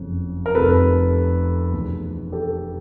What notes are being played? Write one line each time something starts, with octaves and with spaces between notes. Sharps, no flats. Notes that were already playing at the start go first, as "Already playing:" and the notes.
Already playing: F#1 F2 C#3
A#4
F1 F2 C3 A4 B4
F1 E2 B2
G4 A4